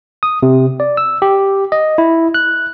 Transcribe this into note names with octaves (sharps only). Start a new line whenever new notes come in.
D#6
C3
D5
E6
G4
D#5
E4
F#6